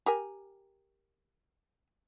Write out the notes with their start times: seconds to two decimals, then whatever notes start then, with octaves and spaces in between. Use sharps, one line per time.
0.06 G4 A#4 G#5